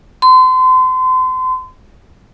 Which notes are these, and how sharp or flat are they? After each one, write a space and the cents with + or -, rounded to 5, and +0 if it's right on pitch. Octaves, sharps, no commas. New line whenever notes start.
C6 -35